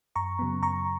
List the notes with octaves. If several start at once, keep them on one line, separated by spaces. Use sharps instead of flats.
F#2 A#5 C#6
C#3 F#3 B3
F#2 A#5 C#6